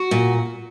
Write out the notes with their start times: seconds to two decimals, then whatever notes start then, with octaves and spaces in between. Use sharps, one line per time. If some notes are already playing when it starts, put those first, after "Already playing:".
Already playing: F#4
0.11 A#2